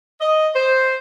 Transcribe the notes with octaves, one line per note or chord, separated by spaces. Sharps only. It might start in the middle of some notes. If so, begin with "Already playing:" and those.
D#5
C5